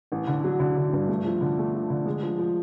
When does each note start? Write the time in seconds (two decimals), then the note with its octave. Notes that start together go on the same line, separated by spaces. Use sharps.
0.12 A1
0.27 D3
0.44 F#3
0.60 D3
0.77 D3
0.93 G2
1.08 A3
1.25 F3
1.41 D3
1.58 A3
1.74 F3
1.90 D3
2.06 G#3
2.22 F3
2.39 F3